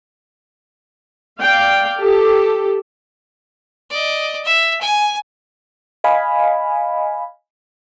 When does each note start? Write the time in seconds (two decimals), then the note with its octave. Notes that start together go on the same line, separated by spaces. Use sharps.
1.41 D5 F5 G5
2.00 G4 A4
3.90 D5 D#5
4.44 E5
4.81 G#5
6.04 D#5 F5 G#5 B5